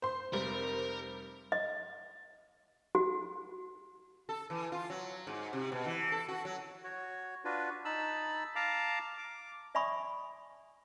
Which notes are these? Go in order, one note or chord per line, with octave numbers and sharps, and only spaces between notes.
C5 C6
F1 G3 C4 A#4
D#5
F#4
A4
E3
F4
F#3
G#2
C3
B2
E3
A4
F#4
F#3
F#4 C#5
D4 F4 F#4 B4
D#4 A5 B5 E6
F5 A5 A#5 D6
D6
D5 E5 G#5 B5 C#6 D#6